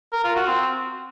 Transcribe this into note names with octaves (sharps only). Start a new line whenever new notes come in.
A#4
F4
F#4
C4